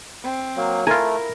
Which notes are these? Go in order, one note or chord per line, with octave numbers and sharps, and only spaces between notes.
C4
F#3 A#3
A3 E4 F4 A#4 G#5